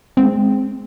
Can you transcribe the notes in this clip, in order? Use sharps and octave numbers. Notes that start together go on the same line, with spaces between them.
G#3 C4